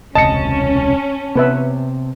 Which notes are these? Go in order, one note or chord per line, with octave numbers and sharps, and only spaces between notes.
E1 C#2 C3 C#4 D#5 A5 C#7
C3 B3 B4 E5